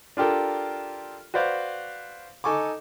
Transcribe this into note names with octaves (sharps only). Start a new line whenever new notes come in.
D4 F4 G4 A4 A#4
F#4 B4 C5 D5 F5
D#4 A4 G#5 C#6 D6